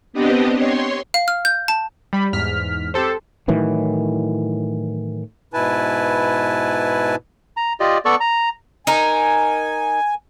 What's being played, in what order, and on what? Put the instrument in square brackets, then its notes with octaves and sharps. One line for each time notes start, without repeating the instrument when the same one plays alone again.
[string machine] B3 C4 D4 G4 D#5
C#5 C6
[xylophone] F5
F6
G6
A5
[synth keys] G3 B5
E2 G#2 F6 B6
C4 G4 A4 C5
[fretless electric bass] A2 D#3 E3 F#3
[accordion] G#2 B2 E4 B4 G#5 A5
[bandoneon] A#5
F4 G4 D5 D#5
B3 A4 D5 C#6
A#5
[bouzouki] D#4 A#4 [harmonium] G#5